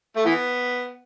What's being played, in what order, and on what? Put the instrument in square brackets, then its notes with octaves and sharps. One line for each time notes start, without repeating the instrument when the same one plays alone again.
[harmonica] A3
E3 B3